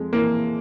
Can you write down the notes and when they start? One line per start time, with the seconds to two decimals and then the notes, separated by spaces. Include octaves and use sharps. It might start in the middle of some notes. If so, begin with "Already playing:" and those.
Already playing: F2 G#3
0.13 E3 A#3